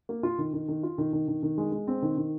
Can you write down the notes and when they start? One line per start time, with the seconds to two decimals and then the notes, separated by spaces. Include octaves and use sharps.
0.09 A#3
0.23 F4
0.38 D#3
0.53 D#3
0.68 D#3
0.83 F4
0.98 D#3
1.13 D#3
1.28 D#3
1.43 D#3
1.58 G#3
1.72 G#3
1.88 C4
2.02 D#3
2.17 D#3